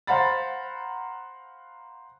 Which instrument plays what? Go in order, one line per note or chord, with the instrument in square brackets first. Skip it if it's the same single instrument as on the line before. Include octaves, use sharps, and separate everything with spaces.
[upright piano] C5 F5 F#5 A#5 B5 A6